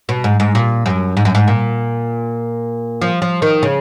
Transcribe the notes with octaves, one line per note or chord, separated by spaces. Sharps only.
B2
G#2
G#2
A#2
F#2
G#2
F#2
G#2
A#2
F3
F3
D#3
C#3